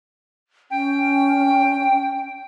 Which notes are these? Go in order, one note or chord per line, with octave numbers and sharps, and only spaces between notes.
C#4 G5